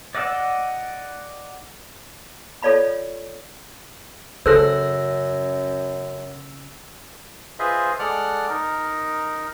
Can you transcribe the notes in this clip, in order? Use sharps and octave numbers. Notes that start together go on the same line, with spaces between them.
D5 D#5 F#5 G5 E6
F4 A4 C#5 D5 F5 B5
F#2 C#3 G#4 A4 C5 E6 F#6 A#6
F4 G#4 B4 C5 D#5 E5
G#3 A4 D5 F#5 F6 F#6
D#4 A#4